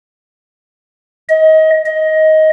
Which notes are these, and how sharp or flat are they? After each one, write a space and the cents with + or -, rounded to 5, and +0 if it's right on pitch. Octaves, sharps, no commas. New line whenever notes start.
D#5 +25
D#5 +15